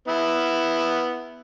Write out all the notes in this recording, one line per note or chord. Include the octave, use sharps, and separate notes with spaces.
B3 E4